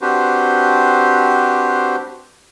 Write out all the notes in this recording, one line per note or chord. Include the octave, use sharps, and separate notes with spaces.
C4 D4 F#4 G4 B4 C5